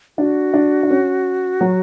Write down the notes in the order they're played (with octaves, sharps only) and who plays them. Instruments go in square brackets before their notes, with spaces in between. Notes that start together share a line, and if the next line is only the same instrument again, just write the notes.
[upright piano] D4 [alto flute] F#4
[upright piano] D4
D4
C#4
F#3